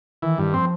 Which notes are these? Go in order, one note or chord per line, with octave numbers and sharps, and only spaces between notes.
D#3 E3
G2
F3 C4